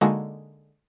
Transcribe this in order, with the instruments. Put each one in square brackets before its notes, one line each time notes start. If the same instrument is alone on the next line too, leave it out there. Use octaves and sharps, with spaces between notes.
[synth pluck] D3 G#3 A#3 D#4 F#4 A4